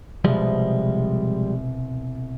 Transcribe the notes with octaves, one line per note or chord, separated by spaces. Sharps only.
C2 B2 F3 G3 G#3 B3